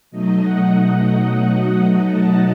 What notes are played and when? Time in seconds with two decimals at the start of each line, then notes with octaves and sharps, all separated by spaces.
0.11 B2 F#3 A3 D#4 D#5
0.39 F#5
1.81 F#5
2.09 A5